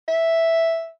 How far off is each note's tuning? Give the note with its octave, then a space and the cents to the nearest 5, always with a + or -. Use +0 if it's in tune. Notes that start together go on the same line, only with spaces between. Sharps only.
E5 +0